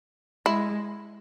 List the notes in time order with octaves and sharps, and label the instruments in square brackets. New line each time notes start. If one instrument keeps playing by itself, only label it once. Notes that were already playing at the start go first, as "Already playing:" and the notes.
[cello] G#3 [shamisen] E4